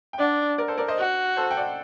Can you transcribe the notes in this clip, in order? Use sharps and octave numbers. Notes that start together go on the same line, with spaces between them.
G5
D4 D5 F#5
A#4 D5
A4 C5
A#4 D5
C5 D#5
F#4
A4 C5
G5
D5 F#5